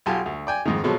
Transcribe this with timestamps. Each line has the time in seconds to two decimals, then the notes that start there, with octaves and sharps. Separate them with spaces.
0.06 B1 F4 G4 G#5 A5
0.26 D2
0.47 D5 G5 G#5
0.65 F2 G#2 D#3
0.84 B2 F3 F#3 G#3 A4